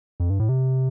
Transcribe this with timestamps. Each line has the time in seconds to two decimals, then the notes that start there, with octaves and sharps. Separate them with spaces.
0.20 F2
0.30 G2
0.40 A2
0.49 C3